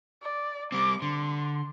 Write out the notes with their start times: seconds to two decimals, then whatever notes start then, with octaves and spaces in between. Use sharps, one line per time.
0.22 D5
0.72 G3 C4 D6
1.02 D3 C6